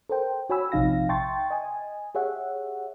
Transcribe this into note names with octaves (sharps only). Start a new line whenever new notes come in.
A4 A#4 C5 G5
F#4 C#5 G#5 B5 E6
A#1 C3 F3 D#4 F5 A#6
E5 G5 A5 C6 C#6 A6
D#5 G#5
G4 G#4 C#5 E5 F#5